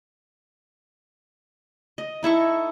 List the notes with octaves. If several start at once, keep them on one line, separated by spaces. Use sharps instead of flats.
D#5
D#4 E4 A4 C#6